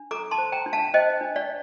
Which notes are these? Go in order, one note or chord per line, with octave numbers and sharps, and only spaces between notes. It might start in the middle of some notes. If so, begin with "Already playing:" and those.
Already playing: D4
A4 A#5 D6
A5 C6
C5
G5 A#5
D4
F5 A5
C5 D#5 G5
D4
D5 F5